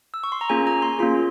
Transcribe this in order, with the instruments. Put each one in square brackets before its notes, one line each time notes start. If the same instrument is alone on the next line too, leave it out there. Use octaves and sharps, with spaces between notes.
[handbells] E6
C#6
C6
A#5
A#3 C#4 F4 G#4 G#5
A#5
C6
A#3 C#4 F4 G#4 C6